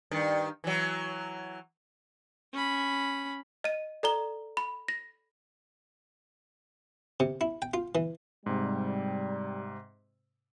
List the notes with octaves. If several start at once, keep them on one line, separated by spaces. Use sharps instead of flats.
G2 D#3
E3 F#3
C#4 B5
D#5 D#7
A4 D5 A#5 G7
B5
A#6
C3
E4
G5
F4
E3
G#2 C3 G3